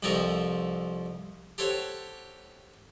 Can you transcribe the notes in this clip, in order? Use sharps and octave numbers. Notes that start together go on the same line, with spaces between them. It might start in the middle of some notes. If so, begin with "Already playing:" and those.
C2 F2 F3 C4 A#4 C#6
G4 A4 C5 C#5 F#5